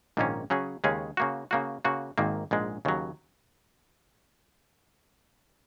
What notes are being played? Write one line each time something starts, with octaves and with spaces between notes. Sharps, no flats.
A#1 G#2 D#3 A#3 C#4
C#3 F#3 C#4 G#4
D#2 C#3 G#3 C#4 G#4
C#3 A#3 F#4
C#3 A#3 F#4
C#3 A#3 F#4
G#1 G#2 D#3 A#3
A#1 G#2 G#3
D#2 C#3 F#3